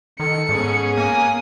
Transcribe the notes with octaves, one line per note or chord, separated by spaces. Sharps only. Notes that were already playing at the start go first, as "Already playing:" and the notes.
D#3 A4 C#7
G#2 B3 C#4 G#4
A#3 G#5 D#6